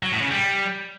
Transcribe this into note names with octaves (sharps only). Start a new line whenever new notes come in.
F#3
A2
C#3
G3